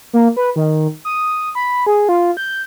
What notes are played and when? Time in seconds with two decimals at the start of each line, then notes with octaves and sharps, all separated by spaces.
0.13 A#3
0.37 B4
0.56 D#3
1.05 D#6
1.55 B5
1.87 G#4
2.09 F4
2.37 G6